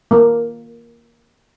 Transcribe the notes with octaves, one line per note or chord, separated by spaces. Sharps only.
A#3